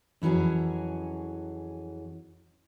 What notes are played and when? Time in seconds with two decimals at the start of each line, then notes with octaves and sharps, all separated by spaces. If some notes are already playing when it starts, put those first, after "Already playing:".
0.22 F2 E3 F#3 C#4 G#4